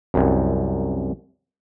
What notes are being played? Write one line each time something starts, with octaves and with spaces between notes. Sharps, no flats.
C2 F#2